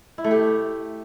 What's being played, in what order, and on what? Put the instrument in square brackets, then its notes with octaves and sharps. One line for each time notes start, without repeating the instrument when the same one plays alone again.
[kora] E4
A3
G4